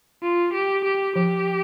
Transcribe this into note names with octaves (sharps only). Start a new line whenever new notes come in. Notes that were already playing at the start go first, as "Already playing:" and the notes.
F4
G4
G4
F3 G4